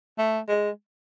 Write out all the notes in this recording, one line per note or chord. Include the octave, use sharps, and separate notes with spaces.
A3
G#3